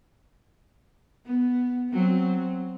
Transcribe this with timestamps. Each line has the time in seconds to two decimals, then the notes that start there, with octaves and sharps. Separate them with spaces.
1.26 B3
1.91 F#3 C4